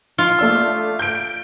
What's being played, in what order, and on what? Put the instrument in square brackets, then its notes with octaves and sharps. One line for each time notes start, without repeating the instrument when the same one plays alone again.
[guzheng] F4
[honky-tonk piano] A3 D5 E6
G6 D7